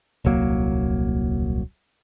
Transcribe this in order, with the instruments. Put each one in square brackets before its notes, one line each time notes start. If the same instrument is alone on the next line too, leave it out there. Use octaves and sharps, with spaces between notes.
[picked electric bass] D#1 C2 F#3 A#3